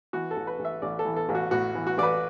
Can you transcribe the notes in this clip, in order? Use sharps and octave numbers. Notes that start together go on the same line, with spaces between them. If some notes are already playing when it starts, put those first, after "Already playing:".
E3 F#4
A4
A1
B4
A1
E5
A1 D5
A4
E3
A4
A1
F#4
A2 F#4
E3
F#4
A1 D5
B4